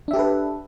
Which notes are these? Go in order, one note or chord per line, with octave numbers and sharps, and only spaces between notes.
D4 G4 A4 B4 E5